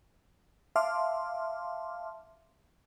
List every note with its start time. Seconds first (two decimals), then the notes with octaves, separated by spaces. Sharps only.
0.76 E5 F5 A5 C6 D6 F6